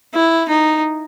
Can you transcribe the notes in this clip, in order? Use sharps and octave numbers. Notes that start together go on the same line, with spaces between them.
E4
D#4